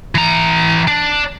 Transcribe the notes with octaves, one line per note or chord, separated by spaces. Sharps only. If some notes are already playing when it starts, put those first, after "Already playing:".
E3 A#5
D4